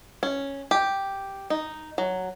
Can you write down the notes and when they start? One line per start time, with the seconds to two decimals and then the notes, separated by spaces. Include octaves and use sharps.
0.23 C#4
0.71 G4
1.50 D#4
1.98 F#3